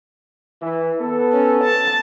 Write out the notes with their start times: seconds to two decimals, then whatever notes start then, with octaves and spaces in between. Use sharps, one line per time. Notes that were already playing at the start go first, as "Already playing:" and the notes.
0.62 E3
1.00 B3 A4
1.33 C#4
1.64 A5